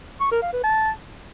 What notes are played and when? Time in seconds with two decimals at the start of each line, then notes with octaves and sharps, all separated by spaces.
0.21 C#6
0.31 A#4
0.42 F5
0.53 B4
0.64 A5